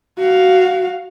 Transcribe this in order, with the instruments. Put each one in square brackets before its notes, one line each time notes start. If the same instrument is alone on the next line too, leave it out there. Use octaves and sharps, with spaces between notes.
[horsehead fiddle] F#4 F5